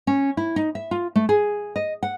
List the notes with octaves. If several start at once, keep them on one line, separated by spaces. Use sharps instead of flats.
C#4
E4
D#4
E5
F4
A3
G#4
D#5
F#5